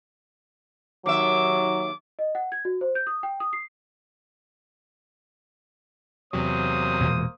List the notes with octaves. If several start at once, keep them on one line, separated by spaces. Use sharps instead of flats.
D#2 F#3 E5 D6
D#5
F#5
G#6
F#4
C5
G6
D#6
G5
D#6
C7
E2 C3 F#3 A#3 C5 D#6
E1 A#2